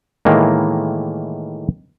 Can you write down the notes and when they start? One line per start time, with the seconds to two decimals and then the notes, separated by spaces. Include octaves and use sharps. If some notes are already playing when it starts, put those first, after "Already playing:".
0.25 A2 D#3 E3 G#3 A#3